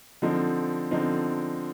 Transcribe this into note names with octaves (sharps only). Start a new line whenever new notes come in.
D3 F3 C4 D#4
D3 F3 C4 D#4